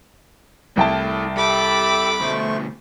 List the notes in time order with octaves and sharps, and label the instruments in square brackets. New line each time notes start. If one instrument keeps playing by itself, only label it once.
[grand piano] C2 G5 A5 [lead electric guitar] E4 A4
[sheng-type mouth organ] G4 E5 [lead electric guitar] A4 [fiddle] B5 D6
[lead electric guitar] D2 B2 [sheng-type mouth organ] A3 C5 C#6